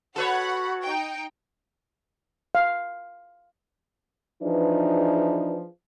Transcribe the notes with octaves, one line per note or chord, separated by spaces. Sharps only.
F#4 A4 B4 C#5 F#5 B5
D#4 G5
F5
E3 F3 D4 D#4 G#4 B4